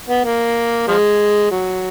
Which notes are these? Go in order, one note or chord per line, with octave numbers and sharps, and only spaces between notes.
B3
A#3
F3 G#3
F#3